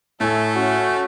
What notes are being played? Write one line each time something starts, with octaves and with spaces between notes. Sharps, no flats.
A2 A3 A4 G#5
C#4 F#4